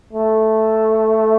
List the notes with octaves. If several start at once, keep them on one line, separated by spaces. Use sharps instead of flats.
A3